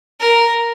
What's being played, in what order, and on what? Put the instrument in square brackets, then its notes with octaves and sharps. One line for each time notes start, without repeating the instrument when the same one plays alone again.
[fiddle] A#4